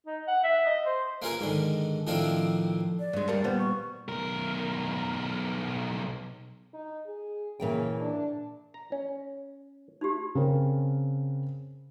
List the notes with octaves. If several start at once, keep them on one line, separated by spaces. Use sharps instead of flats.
D#4
F#5
E5
D#5
C5
A#3 B3 C#4 F4 G#4 A#4
G#2 D3 D#3
A2 D#3 F3 C4 D4 F4
D5
G2 G#3
G3 A#4 A5
A#2 G3 B3 C5
C#6
B1 A#4
D#4
G#4
A#2 C#3 E3 G5
D4
A#5
C#4
D#4 F#4 G4
C#3 C4 A#4